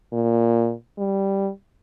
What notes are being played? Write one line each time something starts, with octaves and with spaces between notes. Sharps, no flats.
A#2
G3